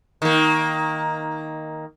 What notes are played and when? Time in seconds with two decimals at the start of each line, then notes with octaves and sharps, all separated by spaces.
0.22 D#3 A#3